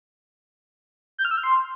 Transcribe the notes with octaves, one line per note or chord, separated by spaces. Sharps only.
G6
F6
E6
F6
C6